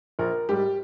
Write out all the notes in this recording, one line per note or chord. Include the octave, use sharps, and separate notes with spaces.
A#1 A#4
G#2 G3 G4